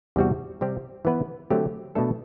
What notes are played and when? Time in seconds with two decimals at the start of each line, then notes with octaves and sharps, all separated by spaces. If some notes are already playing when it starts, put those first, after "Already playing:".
0.16 E2 C3 G3 C4 F#4
0.61 C3 G3 C4 G4
1.05 E3 B3 E4 B4
1.50 D3 F#3 A3 C4 G4
1.95 B2 A3 D4 A4